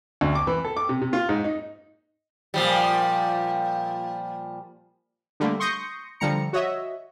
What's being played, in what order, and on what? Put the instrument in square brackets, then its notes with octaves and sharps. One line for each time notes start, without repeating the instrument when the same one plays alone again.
[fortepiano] D2
D6
E3
A4
D6
C3
C3
F4
G#2
D#4
[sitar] A#2 F3 G3
[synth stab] D3 G3 A3 A#3
C6 C#6 D#6 G6 A#6 C#7
D3 F3 G3 A#5 C#7
F#4 C#5 D#5 E5